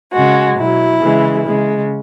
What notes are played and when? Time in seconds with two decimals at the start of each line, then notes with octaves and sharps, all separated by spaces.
0.13 C#3 G#3 F#4
0.57 B2 F#3 E4
1.01 C#3 E3 G#3
1.46 C#3 G#3